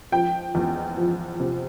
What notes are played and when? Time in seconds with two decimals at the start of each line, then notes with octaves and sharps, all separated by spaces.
0.12 F3 G5
0.55 E2
0.97 F3
1.40 C3